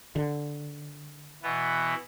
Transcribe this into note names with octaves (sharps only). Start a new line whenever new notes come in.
D3
B2 E3 B3